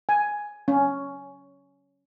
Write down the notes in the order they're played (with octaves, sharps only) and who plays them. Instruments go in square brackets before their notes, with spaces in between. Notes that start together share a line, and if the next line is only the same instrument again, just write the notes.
[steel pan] G#5
C#4